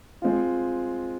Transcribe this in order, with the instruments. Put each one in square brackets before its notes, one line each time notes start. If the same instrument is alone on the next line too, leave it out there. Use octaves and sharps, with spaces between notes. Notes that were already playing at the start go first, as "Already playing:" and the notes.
[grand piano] G#3 C4 F4